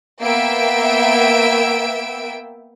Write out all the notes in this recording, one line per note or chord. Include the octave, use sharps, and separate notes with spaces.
A#3 B3 E5 G5 E6 D7